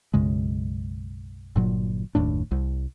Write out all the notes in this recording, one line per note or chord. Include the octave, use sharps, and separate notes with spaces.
B1 F#2 C#3 G#3
G1 A#2 F#3
F#1 D#2 A2 D4
C2